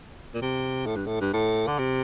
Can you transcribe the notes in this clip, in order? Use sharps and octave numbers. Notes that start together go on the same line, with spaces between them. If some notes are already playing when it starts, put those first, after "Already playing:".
A#2
C3
A2
G2
A2
G2
A2
D3
C3